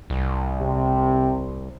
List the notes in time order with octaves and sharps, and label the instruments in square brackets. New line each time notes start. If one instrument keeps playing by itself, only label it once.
[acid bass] C2
[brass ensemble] C3